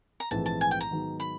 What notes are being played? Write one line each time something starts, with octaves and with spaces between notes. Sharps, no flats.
A#5
A#1 G#2 E3 A3 C4 A5
A5
G#5
G5
A#5
G#2 D#3 F#3 B3 D#4
B5